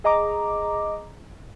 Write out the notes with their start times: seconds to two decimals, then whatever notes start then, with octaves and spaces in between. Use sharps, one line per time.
0.04 G#4 D#5 A#5 D6